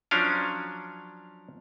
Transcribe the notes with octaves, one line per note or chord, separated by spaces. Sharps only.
F3 F#3 C#4 D4 F5